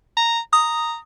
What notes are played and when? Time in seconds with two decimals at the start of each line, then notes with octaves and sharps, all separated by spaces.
0.17 A#5
0.53 A#5 D#6